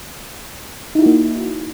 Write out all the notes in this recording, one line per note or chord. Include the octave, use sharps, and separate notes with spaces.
A#3 D#4 E4 F#4